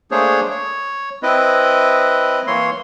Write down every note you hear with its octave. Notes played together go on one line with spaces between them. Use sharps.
A3 A#3 D4 G#4 C5 C#5
C#5
C4 E4 B4 D#5
E3 A#3 C#5 C6